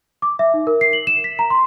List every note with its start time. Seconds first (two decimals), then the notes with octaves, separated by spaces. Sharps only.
0.22 D6
0.39 E5
0.54 D#4
0.67 A#4
0.81 C7
0.93 F#7
1.07 E7
1.24 B6
1.39 A#5
1.50 C6